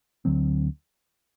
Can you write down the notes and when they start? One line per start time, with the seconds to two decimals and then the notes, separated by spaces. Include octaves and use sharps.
0.25 D2 D3 F#3 C4